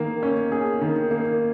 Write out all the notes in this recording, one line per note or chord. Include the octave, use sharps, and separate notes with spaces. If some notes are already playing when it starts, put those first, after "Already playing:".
Already playing: D#3 A#3
C#4
G#4
D#3
A#3